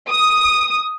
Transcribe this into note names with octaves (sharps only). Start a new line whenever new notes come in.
D#6